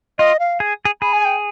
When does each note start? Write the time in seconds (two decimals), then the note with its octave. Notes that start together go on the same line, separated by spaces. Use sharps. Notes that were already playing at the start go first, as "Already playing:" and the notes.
0.19 F4 D#5
0.40 F5
0.60 G#4
0.85 G#4
1.02 G#4 B5
1.13 G#5
1.25 G5